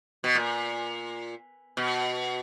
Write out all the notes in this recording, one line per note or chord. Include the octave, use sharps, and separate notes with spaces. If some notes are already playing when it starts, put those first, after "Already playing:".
B2
A#2
B2